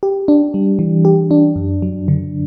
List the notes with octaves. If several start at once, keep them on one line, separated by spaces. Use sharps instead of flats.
G4
D4
G3
E3
G4
D4
F#2
F#3
D3